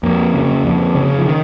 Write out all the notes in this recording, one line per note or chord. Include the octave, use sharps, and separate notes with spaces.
F2 A#3
C#3
F2
C#3
F3
D#3